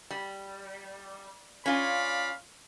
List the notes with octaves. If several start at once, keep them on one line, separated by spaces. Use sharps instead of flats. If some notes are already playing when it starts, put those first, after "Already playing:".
G3
C#4 F4 D5 F5 B5